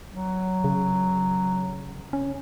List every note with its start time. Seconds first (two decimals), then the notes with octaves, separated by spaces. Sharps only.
0.14 F#3
0.64 C#3
2.13 C#4